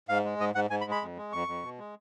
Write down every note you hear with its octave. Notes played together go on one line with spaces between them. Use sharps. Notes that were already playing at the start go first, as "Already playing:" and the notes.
G#2 F5
G#3
G#2 D#5
G#2 F#5
G#2 G#5
B5
G#3
B5
F2
G#3
F2 C#6
F2
B2
G#3